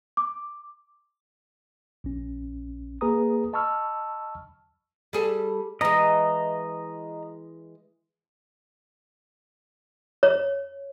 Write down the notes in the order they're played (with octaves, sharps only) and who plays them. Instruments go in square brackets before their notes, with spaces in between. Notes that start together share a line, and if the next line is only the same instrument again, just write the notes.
[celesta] D6
[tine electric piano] A#1 C#4
A#3 G#4 B4 A#5 D#6
D#5 A5 B5 C#6 E6 F6
[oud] G3 G#4 A4
[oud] E3 G#3 [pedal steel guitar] D#5 A#5
[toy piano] C#5